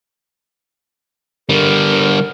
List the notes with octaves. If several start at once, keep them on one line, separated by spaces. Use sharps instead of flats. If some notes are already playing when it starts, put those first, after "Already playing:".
D3 G3 A#4